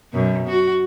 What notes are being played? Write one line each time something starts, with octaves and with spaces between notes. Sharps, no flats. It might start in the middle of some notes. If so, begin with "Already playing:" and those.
F#2 B2
F#4